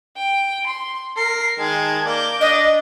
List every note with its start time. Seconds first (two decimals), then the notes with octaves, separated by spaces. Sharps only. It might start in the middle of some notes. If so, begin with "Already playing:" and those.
0.17 G5
0.66 C6
1.17 A#4 C7
1.60 D#3 G#3 A5 G#6
2.05 A#3 D5 D6 G6
2.41 D4 D#5